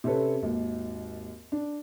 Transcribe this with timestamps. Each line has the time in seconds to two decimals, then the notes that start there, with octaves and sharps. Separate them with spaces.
0.04 C3 C4 C#4 A4 B4
0.42 G#1 D#2
1.52 D4